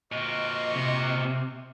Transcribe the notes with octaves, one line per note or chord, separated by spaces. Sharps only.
A#2 C4 F#4 A#4 D#5 C#6
C3